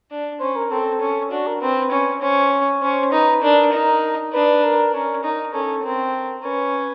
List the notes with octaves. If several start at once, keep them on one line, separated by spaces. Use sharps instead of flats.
D4
C#4 C5
A#4
C4 A4
C#4
D4 F#4
A#4
C4 B4
C#4
C#4 C5
C#5
C#4 C5
D#4 B4
D4 A#4
D#4
D4 B4
A#4
C#4 A#4
D#4 A#4
C#4 A4
C4 A#4
C#4 B4